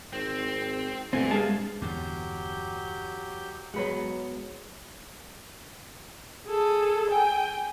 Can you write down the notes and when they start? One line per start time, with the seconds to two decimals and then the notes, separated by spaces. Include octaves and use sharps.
0.13 G#1 C4
1.13 G1 B2 A3 B3 C4 D5 G#5
1.31 G2 G#3 F5 A5
1.82 E2 G2 D3 F#3 G4 G6
3.74 F#3 G#3 B3 F#5
6.47 G#4 A4
7.11 G5 G#5